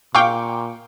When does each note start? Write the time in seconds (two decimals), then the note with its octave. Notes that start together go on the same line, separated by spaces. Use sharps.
0.15 A#2 F5 G5 C#6 D6